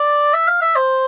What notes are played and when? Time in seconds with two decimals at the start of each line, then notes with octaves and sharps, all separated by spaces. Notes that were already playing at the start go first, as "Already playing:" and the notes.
Already playing: D5
0.33 E5
0.48 F5
0.61 E5
0.75 C5